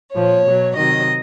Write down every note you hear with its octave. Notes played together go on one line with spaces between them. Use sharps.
A#2 F3 C#5
B2 F#3
C3 D#3 F#3 D#5